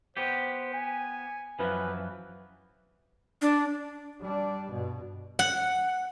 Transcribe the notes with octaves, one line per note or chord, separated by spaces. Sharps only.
B3 G4 C5
G#5
F#2 E3 F3 B4
D4
G3 D4
G2 B2
F#5